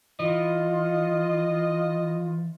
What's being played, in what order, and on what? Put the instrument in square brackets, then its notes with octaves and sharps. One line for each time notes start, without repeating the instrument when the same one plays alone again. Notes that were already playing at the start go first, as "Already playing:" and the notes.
[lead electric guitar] E3 [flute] F4 [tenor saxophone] D#5